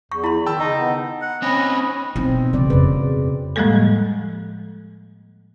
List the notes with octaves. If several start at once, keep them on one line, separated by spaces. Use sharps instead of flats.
E2 C#6
E4 B5 C6
D#3 G5 A5 E6
C#3 D#4
B3
F#5
C4 C#4 D#5 B5
B2 C4 D#4 E4
C#3 E3 D5
F2 C#3 B4
A2 F3 G3 G#3 A#3 A4